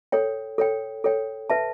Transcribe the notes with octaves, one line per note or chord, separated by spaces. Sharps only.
A4 C#5 G5
A4 C#5 G5
A4 C#5 G5
B4 E5 A5